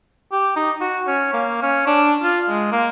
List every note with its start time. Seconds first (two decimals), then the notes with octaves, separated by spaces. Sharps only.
0.32 G4
0.56 D#4
0.81 F#4
1.07 C#4
1.33 A#3
1.62 C#4
1.87 D4
2.23 F4
2.48 G#3
2.72 A#3